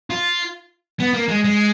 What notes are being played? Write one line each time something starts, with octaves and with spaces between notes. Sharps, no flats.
F4
B3
A#3
G#3
G#3